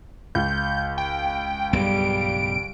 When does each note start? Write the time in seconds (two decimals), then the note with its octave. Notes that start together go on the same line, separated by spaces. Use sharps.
0.35 C#2 G6
0.98 G5
1.73 B1 G2 G3 G#3 D7